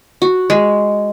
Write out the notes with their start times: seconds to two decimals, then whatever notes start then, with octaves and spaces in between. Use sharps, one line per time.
0.22 F#4
0.50 G#3